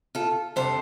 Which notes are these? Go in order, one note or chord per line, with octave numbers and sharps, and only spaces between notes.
F4 A4
F2 C3 G3 D4 A4 C5